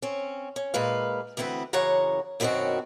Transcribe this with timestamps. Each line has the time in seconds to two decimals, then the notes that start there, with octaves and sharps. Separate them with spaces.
0.02 C4 C#4
0.56 C#4
0.74 A#2 G#3 B4 F5
1.37 D2 E3 B3 C4 B4
1.73 F#2 C#3 E3 C#5 F#5 A#5
2.40 F#2 B2 D#3 C4 C#4 F#4